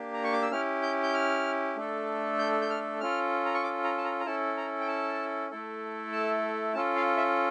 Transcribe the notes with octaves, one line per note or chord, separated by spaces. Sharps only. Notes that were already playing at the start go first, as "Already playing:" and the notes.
Already playing: A#3 D4 G4
A#5
C#6
D6
E6
C#4 E4 G4 F6
G6
G6
F6
A3 D4 A4
G6
G6
F6
C#4 F4 A4 F6
A#5
C#6
D6
A#5
A5
A#5
A#5
C#4 E4 A4 A5
A#5
G5
A5
A3 E4 A4
A5
C#4 F4 A4 A5
F5
E5